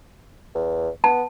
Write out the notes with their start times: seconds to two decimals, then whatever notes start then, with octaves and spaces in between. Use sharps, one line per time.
0.55 E2
1.04 B3 A5